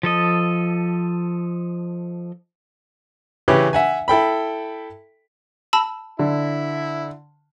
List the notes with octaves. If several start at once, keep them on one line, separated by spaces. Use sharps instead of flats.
F3 A4 D#5
C#3 E3 C#4 E4 G4 B4
E5 F#5 G#5
E4 A4 G5 B5
A5 B5 E6
D3 E4